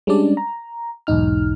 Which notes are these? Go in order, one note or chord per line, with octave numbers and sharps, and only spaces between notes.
G3 G#3 C#4 D4 D5
A#5
B1 E2 G#2 D#4 F6